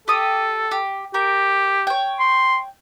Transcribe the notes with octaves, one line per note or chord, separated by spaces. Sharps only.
G4 A4 D#6
G4
G4 A#4
C#5 G5
C6